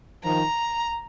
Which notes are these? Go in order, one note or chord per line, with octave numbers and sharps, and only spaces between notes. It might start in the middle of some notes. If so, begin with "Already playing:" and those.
D#3 F3 A#5